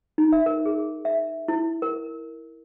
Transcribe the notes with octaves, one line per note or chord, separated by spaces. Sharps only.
D#4
E5
A#4
G#4
E5
E4
A#4